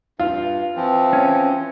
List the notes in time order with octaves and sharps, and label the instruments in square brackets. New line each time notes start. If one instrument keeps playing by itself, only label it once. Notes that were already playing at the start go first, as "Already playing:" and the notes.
[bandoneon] G2 [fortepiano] F4
[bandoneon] E3 F3 C4
[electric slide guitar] C#4